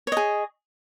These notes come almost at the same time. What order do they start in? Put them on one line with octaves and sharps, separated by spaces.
C#5 D#5 G#4